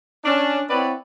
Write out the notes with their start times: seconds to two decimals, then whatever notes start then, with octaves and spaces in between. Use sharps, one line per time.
0.24 C#4 D4
0.69 B3 C4 E4 B4 C#5 D5